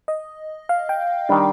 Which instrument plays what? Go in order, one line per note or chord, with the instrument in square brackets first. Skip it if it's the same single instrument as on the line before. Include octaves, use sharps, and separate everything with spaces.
[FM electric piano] D#5
F5
G5
[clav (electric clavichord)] D#3 G3 D4